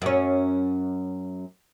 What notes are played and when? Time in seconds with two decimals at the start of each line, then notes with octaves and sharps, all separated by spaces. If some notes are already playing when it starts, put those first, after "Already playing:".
0.02 F#2 C#4